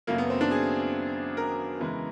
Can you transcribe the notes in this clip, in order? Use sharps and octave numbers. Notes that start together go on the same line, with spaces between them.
F#2 C#3 F#3 A3 A#3
B3
C4
D4
G#4
A#4
E2 C#3 E3 G#3